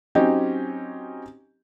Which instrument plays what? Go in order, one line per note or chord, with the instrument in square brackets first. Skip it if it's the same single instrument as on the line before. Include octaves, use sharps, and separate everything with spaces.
[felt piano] F#3 C4 C#4 D#4 G4